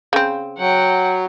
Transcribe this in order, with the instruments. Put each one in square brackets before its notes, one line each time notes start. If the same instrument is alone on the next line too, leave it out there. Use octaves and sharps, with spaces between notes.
[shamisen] C#3 C4
[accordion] F#3 [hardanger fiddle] F#5 G5